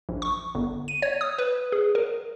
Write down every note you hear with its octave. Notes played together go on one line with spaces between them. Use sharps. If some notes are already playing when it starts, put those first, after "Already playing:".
A#1
C#6
G1
D#7
C#5
D#6
B4
G#4
A#4